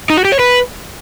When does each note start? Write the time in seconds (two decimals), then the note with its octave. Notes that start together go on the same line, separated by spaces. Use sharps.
0.10 D#4
0.17 F#4
0.25 G4
0.32 C#5
0.39 B4